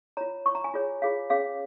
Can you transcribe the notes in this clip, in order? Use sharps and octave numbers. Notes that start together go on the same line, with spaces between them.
F4 C#5 A#5
F4 C#5 C#6
A#5
G#5
F4 G#4 C#5
F4 G#4 C#5 F5
C#4 G#4 C#5 F5